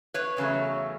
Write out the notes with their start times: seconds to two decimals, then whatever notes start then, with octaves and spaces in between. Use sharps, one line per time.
0.14 B4 C#5
0.37 E2 C#3 F#3 A3